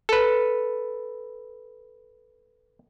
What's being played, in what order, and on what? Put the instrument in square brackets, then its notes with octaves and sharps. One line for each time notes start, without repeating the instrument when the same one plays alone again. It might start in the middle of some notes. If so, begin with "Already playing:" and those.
[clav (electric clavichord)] A4 B4